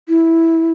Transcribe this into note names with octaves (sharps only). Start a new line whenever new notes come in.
E4